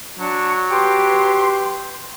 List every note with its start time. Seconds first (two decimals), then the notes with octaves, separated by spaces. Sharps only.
0.19 F#3 D4 A5 C#6
0.71 G4 B4 C6